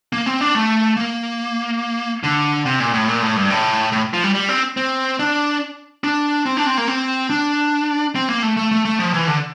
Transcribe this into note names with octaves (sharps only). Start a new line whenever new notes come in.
A#3
C4
D4
A3
A#3
D3
C3
A#2
A2
A#2
A2
G2
A2
A2
F3
G3
G3
C4
C4
D4
D4
C4
D4
C4
A#3
C4
D4
C4
A#3
A3
A3
A3
A3
F3
E3
D3